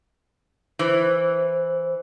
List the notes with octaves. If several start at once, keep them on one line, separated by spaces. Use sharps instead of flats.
E3 C5